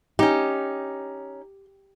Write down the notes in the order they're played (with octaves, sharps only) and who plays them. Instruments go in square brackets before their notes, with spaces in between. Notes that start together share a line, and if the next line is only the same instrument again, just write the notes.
[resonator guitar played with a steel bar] C#4 D#4 [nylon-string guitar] G4